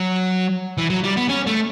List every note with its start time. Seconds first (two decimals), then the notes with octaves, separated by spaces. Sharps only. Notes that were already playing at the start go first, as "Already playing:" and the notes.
Already playing: F#3
0.78 E3
0.90 F#3
1.04 G3
1.17 B3
1.29 C#4
1.47 A3